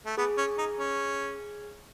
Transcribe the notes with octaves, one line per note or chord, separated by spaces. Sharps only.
A3
B3 G#4
C#4
D#4
C#4